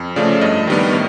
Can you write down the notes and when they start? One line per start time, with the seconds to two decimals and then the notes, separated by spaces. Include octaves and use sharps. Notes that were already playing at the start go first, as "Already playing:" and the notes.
Already playing: F2
0.16 C#3 F3 A3 D5
0.41 G2 D#5
0.67 D#3 G3 B3
0.93 A2